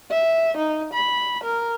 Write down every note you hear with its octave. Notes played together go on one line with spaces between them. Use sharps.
E5
D#4
B5
A#4